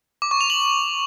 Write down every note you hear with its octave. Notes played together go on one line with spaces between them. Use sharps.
D6
C#6
F7
F#7